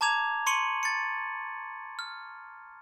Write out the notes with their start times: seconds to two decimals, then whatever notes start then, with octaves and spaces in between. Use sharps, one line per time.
0.01 A5 A#5 D6 G#6 F7
0.46 C6 C#6 C#7 D#7 F#7
0.83 A6 C#7
1.99 F6